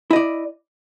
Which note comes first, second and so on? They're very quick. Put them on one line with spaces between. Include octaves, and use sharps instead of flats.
E4 D#5 D5